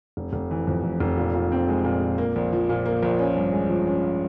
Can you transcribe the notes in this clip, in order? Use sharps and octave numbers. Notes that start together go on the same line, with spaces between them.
F1
F1
E3
F2
F1
F1
A#2
A#2
C4
G#3
A#2
A#2
A#3
A#1
F3
A#2
A#3
A#1
C#4
G2
G#3
F3
C#4